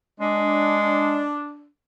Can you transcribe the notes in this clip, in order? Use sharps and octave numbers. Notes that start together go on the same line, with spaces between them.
G#3 D4